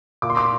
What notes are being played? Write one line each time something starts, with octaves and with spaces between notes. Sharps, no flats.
A#2 D6
C6
D6